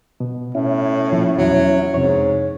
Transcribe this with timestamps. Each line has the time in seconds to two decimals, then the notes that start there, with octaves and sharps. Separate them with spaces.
0.20 B2
0.55 A2 C#4 E4
1.12 A#2 F3
1.37 E2 F#3
1.94 F2 G#2 C3 C#5